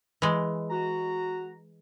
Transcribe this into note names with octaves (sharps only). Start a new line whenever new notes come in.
E3 G#3
F#4 A#5